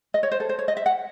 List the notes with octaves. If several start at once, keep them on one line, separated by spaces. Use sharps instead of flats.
D#5
C#5
C5
A4
C5
C#5
D#5
E5
F#5